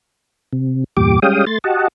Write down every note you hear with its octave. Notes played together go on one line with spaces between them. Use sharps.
C3
E2 G2 A#2 G4 D6
G3 G#3 C#4 F5 G5 D#6
A3 C6 A6
F#4 G4 D#5 F#5 A5